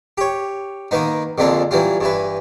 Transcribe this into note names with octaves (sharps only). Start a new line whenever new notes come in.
G4 C#5
D#3 A#3 B3 D#4
A#1 F2 A#2 D3 F4 A4
E3 F#3 G3 F4
G2 E3 B4